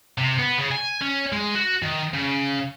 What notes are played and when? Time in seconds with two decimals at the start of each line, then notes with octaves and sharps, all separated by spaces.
0.18 C3
0.39 B3
0.58 C#3
0.72 G#5
1.02 C#4
1.33 G#3
1.55 F#4
1.83 D#3
2.14 C#3